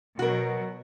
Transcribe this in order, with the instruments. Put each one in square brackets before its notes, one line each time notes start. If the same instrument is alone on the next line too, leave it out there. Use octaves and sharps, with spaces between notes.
[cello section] B2 F#3 [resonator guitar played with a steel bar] F#4 A#4